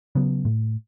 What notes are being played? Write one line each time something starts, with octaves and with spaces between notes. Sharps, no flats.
C#3 F#3 B3
A2